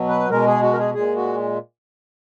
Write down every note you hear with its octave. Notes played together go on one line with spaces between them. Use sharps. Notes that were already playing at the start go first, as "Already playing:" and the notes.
Already playing: B2 F#3
B4
B2 G#3 A#4
G#4
F#4
A#4
G#4
A#2 G#3 G#4
F#4